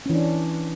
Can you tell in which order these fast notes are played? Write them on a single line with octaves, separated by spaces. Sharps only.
C#4 E3 D4